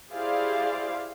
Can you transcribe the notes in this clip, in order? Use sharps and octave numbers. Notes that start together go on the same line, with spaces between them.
E4 G4 G#4 C5 D5 F5